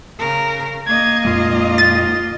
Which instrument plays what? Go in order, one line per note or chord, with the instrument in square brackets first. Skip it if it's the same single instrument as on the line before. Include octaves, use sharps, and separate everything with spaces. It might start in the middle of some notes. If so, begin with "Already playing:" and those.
[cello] C#3 A#4
[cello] A#3 D#5 [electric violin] G#6
[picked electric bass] F2 A#2 G#3 [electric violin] F4
[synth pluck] A6